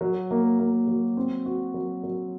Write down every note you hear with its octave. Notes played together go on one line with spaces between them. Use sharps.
F#3
A#3
A#3
F#3
C4
F#4
F#3
F#3